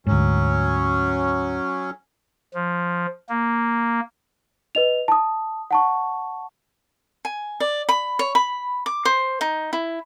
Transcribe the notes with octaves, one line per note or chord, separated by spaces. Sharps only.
D2 G#2 F#3 C#4
F3
A#3
B4 D#5 F7
A5 D#6
F#5 A5 C#6
G#5
D5
B5
C#5
B5
D6
C5
D#4
E4